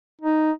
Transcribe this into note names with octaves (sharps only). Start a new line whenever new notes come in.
D#4